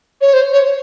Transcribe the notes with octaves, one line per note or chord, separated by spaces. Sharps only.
C#5
C5
C#5